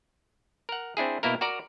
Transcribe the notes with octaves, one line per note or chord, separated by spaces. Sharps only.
A#4 F#5
C4 D4 E4 G#4
B2 A#3 E4 A#4
F#4 A#4 D5 A#5